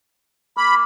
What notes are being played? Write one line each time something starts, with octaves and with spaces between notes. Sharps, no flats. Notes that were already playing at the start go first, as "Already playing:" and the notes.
A#3 B5